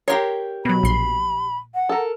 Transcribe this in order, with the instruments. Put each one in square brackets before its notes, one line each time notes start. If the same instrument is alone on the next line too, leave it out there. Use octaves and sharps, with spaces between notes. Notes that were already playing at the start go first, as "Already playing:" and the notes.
[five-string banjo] G4 A#4 C#5 [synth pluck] C6 A#6
[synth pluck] B2 F#3 [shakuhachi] B5
[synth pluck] A#1 C6
[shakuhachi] F#5
[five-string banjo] A4 A#4